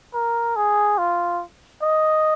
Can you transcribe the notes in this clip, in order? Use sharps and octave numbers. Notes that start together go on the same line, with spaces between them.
A#4
G#4
F4
D#5